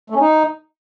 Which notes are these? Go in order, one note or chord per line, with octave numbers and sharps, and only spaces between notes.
A3
C#4
D#4